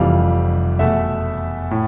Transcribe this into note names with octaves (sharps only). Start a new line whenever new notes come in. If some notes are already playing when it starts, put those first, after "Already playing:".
Already playing: F1 F2 E3 G3 F5
E2 B2 A3 E5
A2